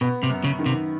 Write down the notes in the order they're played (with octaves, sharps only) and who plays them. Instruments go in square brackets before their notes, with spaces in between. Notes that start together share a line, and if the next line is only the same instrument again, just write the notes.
[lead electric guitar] B2 [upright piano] B3
[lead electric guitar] C3
[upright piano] F#2
[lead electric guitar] C#3
[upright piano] D#3
[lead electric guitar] C3